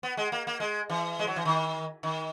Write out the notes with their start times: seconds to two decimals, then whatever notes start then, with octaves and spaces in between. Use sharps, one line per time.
0.03 B3
0.17 G#3
0.32 A#3
0.47 A#3
0.60 G#3
0.90 E3
1.19 G#3
1.27 F#3
1.36 E3
1.45 D#3
2.03 D#3